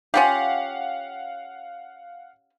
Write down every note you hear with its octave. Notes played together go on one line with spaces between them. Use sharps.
C#4 F4 G4 F5 F#5